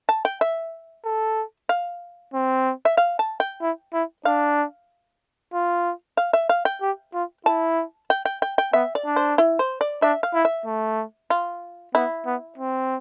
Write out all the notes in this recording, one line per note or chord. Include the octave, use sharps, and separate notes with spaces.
A5
G5
E5
A4
F5
C4
E5
F5
A5
G5
E4
E4
D4 F5
F4
F5
E5
F5
G5
G4
F4
E4 A5
G5
G5
G5
G5
B3 E5
D5
D4
C5
E4
C5
D5
D4 E5
F5
E4
E5
A3
F4
B3 E4
B3
C4